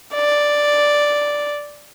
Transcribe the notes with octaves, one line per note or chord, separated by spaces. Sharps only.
D5